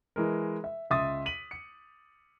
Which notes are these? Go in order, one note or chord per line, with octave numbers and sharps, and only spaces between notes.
E3 G#3 A#4
E5
C#2 E5 C6 D#6 A6
B6 D#7 F#7
C#7